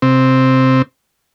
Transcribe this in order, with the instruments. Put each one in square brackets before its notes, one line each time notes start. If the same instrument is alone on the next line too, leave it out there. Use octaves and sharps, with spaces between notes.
[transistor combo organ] C3 C4